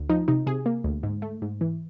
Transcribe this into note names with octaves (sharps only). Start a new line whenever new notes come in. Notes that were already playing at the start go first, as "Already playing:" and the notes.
Already playing: D2
F3 D#4
C3 D#4
C3 G#4
A#3
D2
G#2
A3
G#2
E3